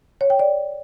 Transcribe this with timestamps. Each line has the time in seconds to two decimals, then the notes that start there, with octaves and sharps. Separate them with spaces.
0.21 C#5
0.30 G5
0.39 D5